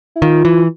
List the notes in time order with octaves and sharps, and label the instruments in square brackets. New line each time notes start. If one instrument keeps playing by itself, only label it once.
[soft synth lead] E4
[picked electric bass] D#3 [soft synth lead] F4
[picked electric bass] E3